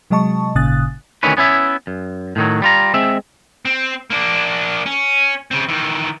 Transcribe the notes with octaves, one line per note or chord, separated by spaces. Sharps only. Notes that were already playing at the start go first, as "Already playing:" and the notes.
C3 F#3 G#3 D#5 A5 C#6
G#1 A#2 C#3 D#6 F#6 A6
D2 D#3 E3 C#4 B4
B3 C#4 E4 E5
F#2
A2 D#3 F#3
G3 F4 A#5
G#3 C4 E5
C4
A#3 D4
C#4
C#3 C4
D#3 E3